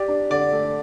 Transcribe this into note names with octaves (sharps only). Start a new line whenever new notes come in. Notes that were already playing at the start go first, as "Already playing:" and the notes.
Already playing: G4 D5
D4
D3 D5
A3